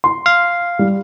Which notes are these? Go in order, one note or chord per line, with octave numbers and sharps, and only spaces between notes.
C6
F5
G3